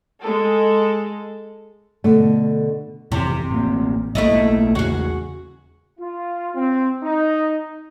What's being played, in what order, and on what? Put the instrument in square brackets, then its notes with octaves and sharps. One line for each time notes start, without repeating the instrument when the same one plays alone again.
[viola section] G#3 A4
[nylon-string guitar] B2 D3 A3
[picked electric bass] F1 F2 E3 [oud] C3
[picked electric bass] A1 A#3
[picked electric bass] B1 B2 A#3 [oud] A3 E4 D#5
[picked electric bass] E2 C#3 G#3 [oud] F#4 G#4
[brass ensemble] F4
C4
D#4